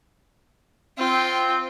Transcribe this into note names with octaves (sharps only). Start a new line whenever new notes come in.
C4 F4 G5